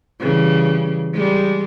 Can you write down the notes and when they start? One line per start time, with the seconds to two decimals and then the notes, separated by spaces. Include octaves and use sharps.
0.20 C#3 E3 G3
1.13 G3 G#3